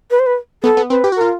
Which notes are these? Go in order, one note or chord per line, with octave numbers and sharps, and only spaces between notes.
B4
C5
B4
B3 A4
B3
C4 B4
G4
F#4
F4 A#4